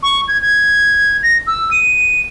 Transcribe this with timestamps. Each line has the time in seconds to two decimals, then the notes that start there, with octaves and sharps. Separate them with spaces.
0.03 C#6
0.28 G#6
0.42 G#6
1.23 A#6
1.47 E6
1.71 D#7